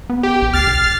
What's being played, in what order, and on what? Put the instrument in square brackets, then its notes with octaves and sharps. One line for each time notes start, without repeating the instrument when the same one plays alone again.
[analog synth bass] B3
[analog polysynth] G4
[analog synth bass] A#1
[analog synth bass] D2 [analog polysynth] F6 A6 C7
[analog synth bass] B1